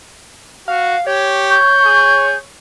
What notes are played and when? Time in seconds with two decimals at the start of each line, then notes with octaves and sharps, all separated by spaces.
0.68 F#4 F5
1.07 G4 C#5
1.50 C#6 G6
1.85 G#4